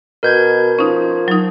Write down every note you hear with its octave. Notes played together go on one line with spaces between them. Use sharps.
B2 A#4 G6 G#6
F3 C#4 D#4
F#3 D#4